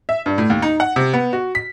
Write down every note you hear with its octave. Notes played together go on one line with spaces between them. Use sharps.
E5
G2
A2
D#2
D#4
F#5
C3
B3
F#4
B6